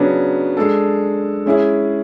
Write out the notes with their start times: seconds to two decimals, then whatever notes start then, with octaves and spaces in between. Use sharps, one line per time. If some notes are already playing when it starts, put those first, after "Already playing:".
Already playing: C#3 F#3 B3 D4
0.57 G#3 D4 A4
1.46 G#3 C#4 E4 G#4